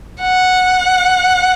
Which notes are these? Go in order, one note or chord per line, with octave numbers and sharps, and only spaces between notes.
F#5